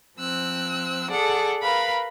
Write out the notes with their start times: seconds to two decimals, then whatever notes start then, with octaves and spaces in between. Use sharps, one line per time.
0.18 F3 C4 E6 F#6
1.10 G#4 A4 D5 F#5
1.62 A#4 B4 F5 B5